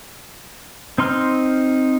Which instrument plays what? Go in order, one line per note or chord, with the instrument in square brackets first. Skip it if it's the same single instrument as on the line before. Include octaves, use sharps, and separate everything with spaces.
[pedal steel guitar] C4 D#4 C6 F6